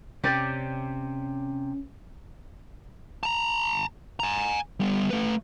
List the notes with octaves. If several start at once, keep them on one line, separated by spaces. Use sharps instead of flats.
C3 C#4 G4 D5
A5 A#5
G#5 A#5
G3 B3
A3 B4